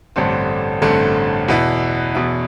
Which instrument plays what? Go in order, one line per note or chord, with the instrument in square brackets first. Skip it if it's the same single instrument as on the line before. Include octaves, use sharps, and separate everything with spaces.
[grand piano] A1 G2 D3 A3 C4
A1 G2 D3 A3 C4
E2 B2 B3 E4
E2 B2 B3 E4